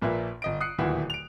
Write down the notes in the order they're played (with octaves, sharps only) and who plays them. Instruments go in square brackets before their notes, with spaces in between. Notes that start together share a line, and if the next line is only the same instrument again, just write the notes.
[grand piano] A#1 A#2 A#3 B4 E5
G1 D#5 D7
D#6 F#6 C7 C#7
D1 D#2 A#2 E4 F#4 B4
D7 F7